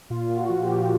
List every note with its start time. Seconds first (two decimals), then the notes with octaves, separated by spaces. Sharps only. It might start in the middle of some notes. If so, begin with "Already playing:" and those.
0.10 A#2 F4
0.30 A#2
0.36 F#4
0.49 F3
0.62 G4
0.69 F3